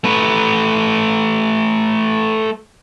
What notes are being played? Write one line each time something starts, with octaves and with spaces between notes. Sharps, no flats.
A3 B4